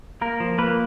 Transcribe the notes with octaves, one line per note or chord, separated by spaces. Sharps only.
A#3 A#4
F3
A#3 B4